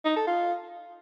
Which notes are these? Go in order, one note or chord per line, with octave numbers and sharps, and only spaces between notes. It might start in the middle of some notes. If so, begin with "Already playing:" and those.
D#4
A4
F4